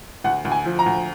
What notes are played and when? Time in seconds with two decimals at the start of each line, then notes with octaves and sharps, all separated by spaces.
0.24 D2 F#5
0.45 D2
0.52 G#5
0.66 F3
0.79 A#5
0.86 D2